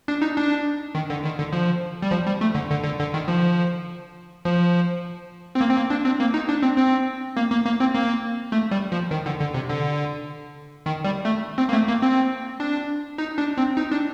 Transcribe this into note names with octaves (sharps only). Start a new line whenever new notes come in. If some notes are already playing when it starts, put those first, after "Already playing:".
D4
D#4
D4
D#3
D3
D#3
D3
F3
G3
F3
G3
A3
D3
D3
D3
D3
D#3
F3
F3
C4
A#3
C4
A#3
D4
C4
A#3
D#4
D4
C4
C4
A#3
A#3
A#3
C4
A#3
A3
G3
F3
D#3
D3
D3
C3
D3
D#3
G3
A3
C4
A#3
A3
A#3
C4
D4
D#4
D4
C4
D#4
D4